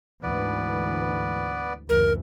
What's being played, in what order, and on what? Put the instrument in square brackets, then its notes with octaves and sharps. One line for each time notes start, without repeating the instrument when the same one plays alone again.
[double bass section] D2 G#2 E3 [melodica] B3 B4 D5
[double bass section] F#1 D2 E3 [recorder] A#4